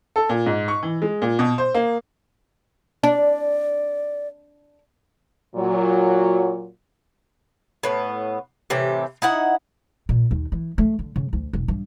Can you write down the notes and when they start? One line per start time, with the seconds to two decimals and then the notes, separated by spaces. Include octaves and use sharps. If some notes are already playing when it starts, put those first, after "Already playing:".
0.16 A4
0.29 A#2
0.46 G#2
0.68 C#6
0.83 E3
1.02 G#3
1.22 A#2
1.39 B2
1.58 C5
1.74 A#3
3.03 D4 D5
5.56 A#2 F#3
7.83 A2 B3
8.70 A2 C3 E3 G4
9.22 D#4 E4 F#5
10.09 A#2
10.31 D#2
10.52 E3
10.78 A3
10.99 D3
11.16 C#3
11.33 D2
11.53 E1
11.68 G2